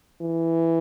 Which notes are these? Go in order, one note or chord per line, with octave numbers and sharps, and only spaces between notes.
E3